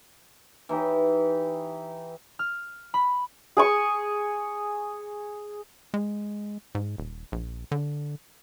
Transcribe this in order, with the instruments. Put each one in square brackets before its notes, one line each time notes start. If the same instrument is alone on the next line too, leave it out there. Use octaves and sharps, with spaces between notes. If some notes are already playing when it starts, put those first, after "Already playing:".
[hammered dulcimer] E3 D#4 G4
[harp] F6
B5
[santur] G#4 G#5 C#6
[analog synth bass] G#3
G#2
D#1
A#1
D3